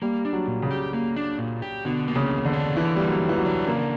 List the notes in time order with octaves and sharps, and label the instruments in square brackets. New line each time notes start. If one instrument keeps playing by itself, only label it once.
[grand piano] G3 [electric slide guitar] A#3
[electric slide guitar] D4
[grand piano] F#3
[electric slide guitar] A#2
[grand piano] C#3
[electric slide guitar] G4
A#3
D4
A#2
G4
[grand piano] B2 [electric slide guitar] D3
[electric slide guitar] A#3
[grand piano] C#3
[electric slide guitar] E2
[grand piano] D3
[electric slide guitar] D4
[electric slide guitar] D3 [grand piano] E3
[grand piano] G3 [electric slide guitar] A#3
[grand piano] F#3
[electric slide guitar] E2
[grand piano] E3
F#3
[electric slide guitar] D4
[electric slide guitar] C#3 [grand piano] A#3